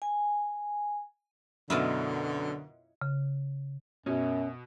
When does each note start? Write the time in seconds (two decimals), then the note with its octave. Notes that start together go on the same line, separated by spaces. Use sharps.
0.02 G#5
1.70 F#2 B2 D3 E4 F4 D#5
3.01 C#3
4.06 F#2 B2 C#4